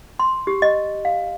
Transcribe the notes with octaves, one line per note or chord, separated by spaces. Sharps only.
C6
G4
D#5
F5